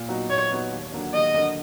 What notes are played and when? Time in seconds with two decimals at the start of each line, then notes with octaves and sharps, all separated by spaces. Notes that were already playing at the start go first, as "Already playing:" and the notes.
Already playing: A#2
0.09 F#3 B3 D#4 F#4
0.30 A#2 C#5
0.50 F#3 B3 D#4 F#4
0.71 D#2
0.92 D3 F#3 A#3 D4
1.13 D#2 D#5
1.34 D3 F#3 A#3 D4